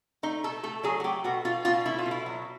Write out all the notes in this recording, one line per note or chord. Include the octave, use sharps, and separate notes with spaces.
A3 D#4
B2 A4
A3 A4
F#3 G#4
F#4
A3 G4
B2 F#4
B2 F4
B2 F4
A3 E4
F4
B2
E4
F#3